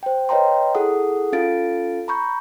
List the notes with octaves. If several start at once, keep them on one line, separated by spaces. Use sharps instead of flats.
C5 G5
B4 C#5 D#5 G5 A#5 C6
E4 G#4 A4 F#5 D#6
C#4 F4 A4 F5 A6 D7
A#5 B5 C#6 G6